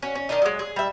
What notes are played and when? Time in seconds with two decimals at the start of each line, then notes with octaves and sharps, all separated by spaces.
0.02 C#4 F#4
0.15 C#4
0.29 D#3 D4 D#4
0.42 F#3 G#3
0.59 G#4
0.76 G3 E5